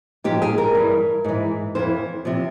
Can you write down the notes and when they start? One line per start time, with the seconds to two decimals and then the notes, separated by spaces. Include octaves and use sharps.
0.24 G#2 F3 G4
0.42 G#4
0.58 A#4
0.74 G2 E3
1.24 G#2 E3
1.75 F2 E3 C5
2.25 C3 F3